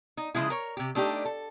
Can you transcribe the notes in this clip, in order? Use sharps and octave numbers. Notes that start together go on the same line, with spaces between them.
D#4
C#3 F3 G#3 E4
A#4 C#5
C3 G4
A3 D4 D#4 G4
A4